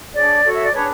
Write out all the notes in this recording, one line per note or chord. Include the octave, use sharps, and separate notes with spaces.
D4 G#4 C#5 D5
F#4 A4 C#5
E5
D5
D4 G#4 B4 C#5